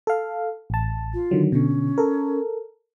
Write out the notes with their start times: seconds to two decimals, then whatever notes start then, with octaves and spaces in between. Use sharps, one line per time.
0.07 A4 F5
0.70 A1 A5
1.14 F4
1.31 D3 D#3 F#3
1.52 B2 D3 C#4
1.98 A4 A#4